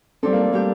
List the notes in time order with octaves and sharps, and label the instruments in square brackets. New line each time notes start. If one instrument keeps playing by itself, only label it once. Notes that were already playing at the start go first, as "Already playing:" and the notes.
[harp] G3 D4 A4 [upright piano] C4
[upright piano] A#3
A3
[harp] G3 D4 G4 [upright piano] A#3